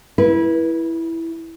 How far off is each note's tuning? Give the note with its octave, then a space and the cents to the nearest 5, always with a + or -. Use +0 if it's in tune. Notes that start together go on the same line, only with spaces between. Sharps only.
E4 +0 B4 -30